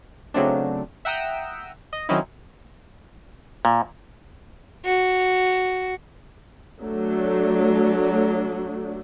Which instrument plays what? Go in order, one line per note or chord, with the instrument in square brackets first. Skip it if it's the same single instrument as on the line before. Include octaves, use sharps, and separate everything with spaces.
[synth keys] C#3 F#3 A3 C4 D4
E5 F#5 G5 A#5 D#6 E6
D#5
D#3 F#3 C4 C#4 D#4 E4
[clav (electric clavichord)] A#2
[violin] F#4
[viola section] F#3 A3 D4